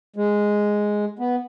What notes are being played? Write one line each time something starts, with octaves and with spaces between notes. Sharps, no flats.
G#3
B3